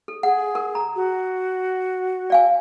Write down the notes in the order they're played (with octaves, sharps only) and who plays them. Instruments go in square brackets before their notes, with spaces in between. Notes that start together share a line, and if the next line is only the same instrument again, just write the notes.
[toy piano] A4
[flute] G#4 [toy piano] F#5
[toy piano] A#4
A#5
[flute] F#4
[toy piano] D5 F5 G#5